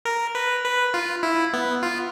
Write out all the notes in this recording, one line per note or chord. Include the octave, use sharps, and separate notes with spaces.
A#4
B4
B4
F4
E4
B3
F4